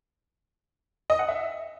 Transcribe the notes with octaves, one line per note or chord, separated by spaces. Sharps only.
D#5
F#5
E5